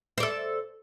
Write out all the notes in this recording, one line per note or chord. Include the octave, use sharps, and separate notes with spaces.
A4 C5 D5